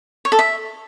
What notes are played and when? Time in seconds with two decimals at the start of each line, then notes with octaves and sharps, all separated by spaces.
0.25 C#5
0.32 A4
0.39 E5